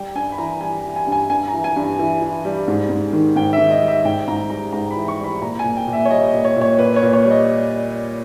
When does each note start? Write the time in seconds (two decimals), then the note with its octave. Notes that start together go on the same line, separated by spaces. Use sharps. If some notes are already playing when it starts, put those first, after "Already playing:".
Already playing: G3 G5
0.15 G2 G#5
0.32 B5
0.38 E3 A#5
0.61 G3 G#5
0.84 E3
0.96 G#5
1.07 G2
1.12 G#5
1.30 G2 G#5
1.48 A#5
1.53 E3
1.64 G#5
1.76 G2
1.99 E3
2.22 E3
2.45 G3
2.68 G#2
2.90 G#2
3.13 D#3
3.36 G#2 G5
3.53 E5
3.58 D#3
3.71 D#5
3.82 G3
3.88 E5
4.05 G#2 G5
4.28 G#2 A#5
4.50 G3 A#5
4.73 G#2 A#5
4.91 B5
4.96 E3
5.08 C#6
5.19 G3
5.24 B5
5.41 A#2 A#5
5.59 A#2 G#5
5.77 G5
5.87 A#2
5.93 E5
6.05 C#5
6.11 G3 D#5
6.27 D#5
6.34 A#2
6.45 C#5
6.56 A#2
6.61 C#5
6.79 A#2 B4
6.96 C#5
7.03 A#2
7.13 C#5
7.25 G3
7.31 D#5